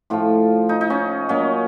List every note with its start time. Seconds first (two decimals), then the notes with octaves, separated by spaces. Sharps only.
0.10 A2 F3 F4
0.69 D#4
0.81 D#4
0.90 C#4
1.29 A#2 F#3 C#4